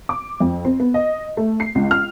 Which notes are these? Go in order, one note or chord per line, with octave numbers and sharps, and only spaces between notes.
D6
F2
C4
B3
D#5
A3
C7
C#2
F6